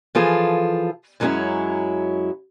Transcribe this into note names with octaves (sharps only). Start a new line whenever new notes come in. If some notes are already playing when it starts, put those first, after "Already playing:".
E3 F3 F4 G#4 A4
F#2 F#3 G#3 B3 C#4 E4